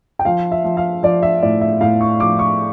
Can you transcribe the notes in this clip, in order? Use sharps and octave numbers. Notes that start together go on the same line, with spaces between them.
G5
F3 F5
E5
F3
F5
F3 D5
E5
A2 D5
E5
A2 F5
C#6
F3 D6
C#6